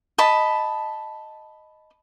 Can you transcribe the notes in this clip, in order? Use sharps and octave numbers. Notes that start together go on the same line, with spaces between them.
D#5 A5 B5